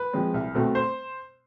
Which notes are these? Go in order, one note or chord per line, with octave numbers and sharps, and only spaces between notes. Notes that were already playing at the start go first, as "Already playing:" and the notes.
Already playing: B4
F3 G#3 C4
C2
B2 A3 C4
C5